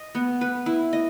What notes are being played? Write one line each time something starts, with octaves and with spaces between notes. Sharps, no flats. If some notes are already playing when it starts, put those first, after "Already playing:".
Already playing: D#5
B3
B4
E4
D#5